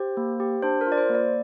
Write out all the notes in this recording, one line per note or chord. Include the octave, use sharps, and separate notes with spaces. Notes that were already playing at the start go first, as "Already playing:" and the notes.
Already playing: G4 C5
A#3
G4
D4 C5
A#4
F4 D5
C5
A#3
D5